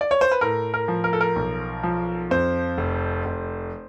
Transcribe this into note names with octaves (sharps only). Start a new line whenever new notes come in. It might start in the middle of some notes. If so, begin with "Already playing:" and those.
D5
C#5
C5
B4
A2 A#4
A#4
F3
A#4
A4
A#4
B1
F3
F2 C5
F1
F1